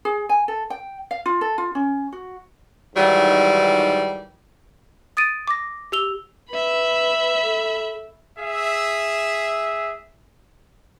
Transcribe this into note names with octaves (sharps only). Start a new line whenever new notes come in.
G#4
G#5
A4
G5
F5
F4
A4
F4
C#4
F#4
G#2 D#3 E3 F#3 G3
D#6 A6 D7 D#7
D6 A#6
G4 E6 F7 G7
B4 E5 B5
A4
G#4 E5